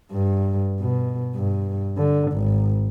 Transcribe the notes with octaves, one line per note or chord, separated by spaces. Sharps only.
G2
B2
G2
D3
G#1